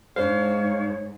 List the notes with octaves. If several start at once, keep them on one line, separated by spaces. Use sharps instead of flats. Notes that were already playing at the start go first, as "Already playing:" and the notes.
G#2 D4 C5 C#5 F5